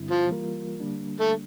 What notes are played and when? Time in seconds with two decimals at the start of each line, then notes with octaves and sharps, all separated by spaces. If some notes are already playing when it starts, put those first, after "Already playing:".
Already playing: G2 D3 G3 C4 E4
0.11 F3
0.28 E3 G3 A#3 F4 A#4
0.80 D3 G3 A#3 D4
1.21 A3